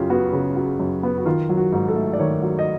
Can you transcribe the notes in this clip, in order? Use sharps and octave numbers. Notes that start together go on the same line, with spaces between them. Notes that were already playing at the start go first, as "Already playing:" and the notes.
Already playing: F#2 C#3 F#3 F4 G4
B3 F#4
C#3
F#3
F#2
B3
F#4
D#3 F4
F#3
F#4
G#2
A4
A3
D5
D#3 C#5
F#3
D#5